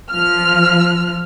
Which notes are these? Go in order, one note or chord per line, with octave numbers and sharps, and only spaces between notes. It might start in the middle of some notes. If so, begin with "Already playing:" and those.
F3 F6